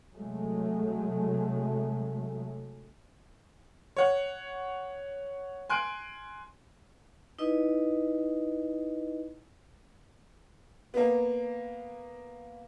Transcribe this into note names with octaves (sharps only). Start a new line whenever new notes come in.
C3 F#3 G#3 A3
C#5 F#5
G#5 C6 F#6 D7
D#4 E4 B4 D#5
A#3 B3